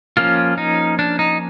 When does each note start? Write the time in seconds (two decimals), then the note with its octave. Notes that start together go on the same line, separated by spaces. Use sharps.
0.17 F3 A#3 C#4 F4
0.58 D#4
0.99 D4
1.19 D#4